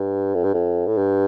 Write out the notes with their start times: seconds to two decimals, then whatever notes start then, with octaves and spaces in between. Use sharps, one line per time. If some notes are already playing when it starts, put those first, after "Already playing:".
Already playing: G2
0.34 F2
0.44 G2
0.54 F2
0.87 A2
0.97 G2